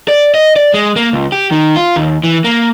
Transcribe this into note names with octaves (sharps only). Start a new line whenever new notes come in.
D5
D#5
D5
G#3
A#3
C#2
G4
D#3
F4
D#2
E3
A#3